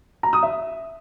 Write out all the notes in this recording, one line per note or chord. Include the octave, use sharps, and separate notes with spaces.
A#5
D#6
E5